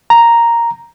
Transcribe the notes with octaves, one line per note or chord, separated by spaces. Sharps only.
A#5